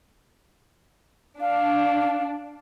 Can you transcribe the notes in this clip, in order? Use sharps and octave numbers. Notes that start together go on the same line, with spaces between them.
D4 F5